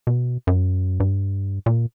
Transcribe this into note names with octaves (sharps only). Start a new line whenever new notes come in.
B2
F#2
G2
A#2